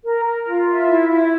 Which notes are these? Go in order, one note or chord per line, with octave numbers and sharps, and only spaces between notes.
A#4
A#4
F4
E5
E4
E4